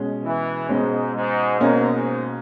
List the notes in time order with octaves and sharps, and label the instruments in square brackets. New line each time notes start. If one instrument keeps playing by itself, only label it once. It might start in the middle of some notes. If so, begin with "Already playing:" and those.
Already playing: [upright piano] B2 G#3 C#4
[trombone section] E3
[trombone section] G#2 [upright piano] B2 G#3 C#4
[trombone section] G#2
[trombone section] G#2 [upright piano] B2 A#3 C#4
[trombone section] G#2